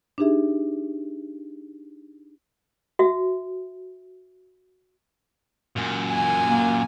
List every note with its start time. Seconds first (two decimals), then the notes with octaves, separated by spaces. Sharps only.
0.18 D4 D#4 G4 G#4 E5
2.99 F#4 E5
5.76 F#2 A#2
6.11 G#5
6.47 A#3